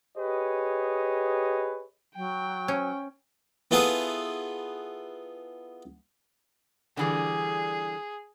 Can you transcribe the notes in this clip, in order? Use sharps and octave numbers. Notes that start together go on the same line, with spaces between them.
G4 G#4 B4 C#5 D#5
F#3 G5
C#4
B3 E4 F4 G#4 A4 B4
D3 E3 G3 G#4